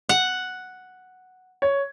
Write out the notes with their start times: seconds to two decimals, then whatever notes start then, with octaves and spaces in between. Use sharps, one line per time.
0.09 F#5
1.62 C#5